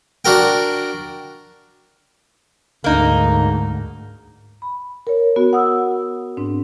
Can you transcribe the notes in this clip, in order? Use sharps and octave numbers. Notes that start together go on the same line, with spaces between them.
D4 F#4 A#4 G5
D2 G#2 A#3 D#4
B5
A#4 C#5
B3 F#4
F#5 D#6 E6
G#2 C4 D4